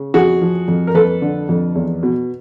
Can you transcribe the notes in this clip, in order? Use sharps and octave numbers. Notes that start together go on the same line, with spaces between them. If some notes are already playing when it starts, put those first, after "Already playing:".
Already playing: C#3
F2 F#4 G#4
F3
F2
A#4
F2 A4 B4
D3
F2
E2
B2